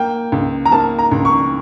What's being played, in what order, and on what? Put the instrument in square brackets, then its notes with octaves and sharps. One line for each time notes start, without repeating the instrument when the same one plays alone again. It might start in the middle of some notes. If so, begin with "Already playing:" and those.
Already playing: [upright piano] A#3 G5
C#2
A#5
A#3 A5
A#5
C#2
C#6